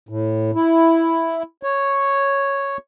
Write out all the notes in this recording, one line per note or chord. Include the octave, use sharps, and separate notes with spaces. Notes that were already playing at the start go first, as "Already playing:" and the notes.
A2
E4
C#5